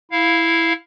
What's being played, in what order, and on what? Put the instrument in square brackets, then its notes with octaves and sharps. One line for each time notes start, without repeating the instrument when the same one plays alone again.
[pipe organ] E4 F5